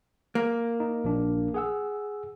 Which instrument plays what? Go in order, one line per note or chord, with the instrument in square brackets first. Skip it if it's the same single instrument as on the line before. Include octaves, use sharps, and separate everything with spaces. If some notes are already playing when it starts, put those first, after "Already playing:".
[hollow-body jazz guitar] A#3
[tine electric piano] D#4
A#1 D4
G#4 F#5 E6